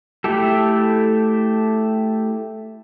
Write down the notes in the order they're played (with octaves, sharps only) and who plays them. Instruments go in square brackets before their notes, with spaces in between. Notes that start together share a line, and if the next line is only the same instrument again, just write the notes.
[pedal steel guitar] A3 E4 G4 A4